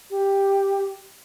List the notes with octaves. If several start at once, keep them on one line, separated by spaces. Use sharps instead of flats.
G4